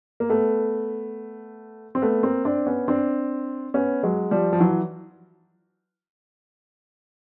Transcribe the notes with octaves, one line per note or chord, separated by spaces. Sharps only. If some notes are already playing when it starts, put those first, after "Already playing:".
A#3
A3 B3
C4
A3 B3
A#3 C4
C4 D4
B3 C#4
C4 D4
B3 C#4
F#3 G#3
F3 G3
F3
E3 F#3